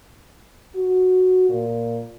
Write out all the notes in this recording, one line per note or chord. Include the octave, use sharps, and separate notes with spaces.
F#4
A#2